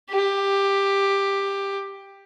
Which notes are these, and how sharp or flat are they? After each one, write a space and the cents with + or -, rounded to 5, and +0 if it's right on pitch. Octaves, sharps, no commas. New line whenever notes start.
G4 +10